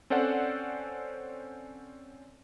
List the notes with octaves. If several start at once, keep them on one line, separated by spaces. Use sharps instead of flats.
C4 C#4 A4 C5 D5 F#5